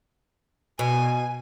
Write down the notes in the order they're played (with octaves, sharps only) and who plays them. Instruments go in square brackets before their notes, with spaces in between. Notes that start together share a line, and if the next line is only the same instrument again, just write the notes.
[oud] B2 [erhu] G#5